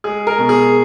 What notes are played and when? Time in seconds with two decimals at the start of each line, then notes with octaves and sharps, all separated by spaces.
0.04 G#3 G#4
0.27 A#4
0.38 B2
0.49 G#4